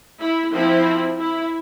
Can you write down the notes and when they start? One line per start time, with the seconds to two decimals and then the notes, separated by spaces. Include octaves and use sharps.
0.20 E4
0.52 F3 C4 E4
1.18 E4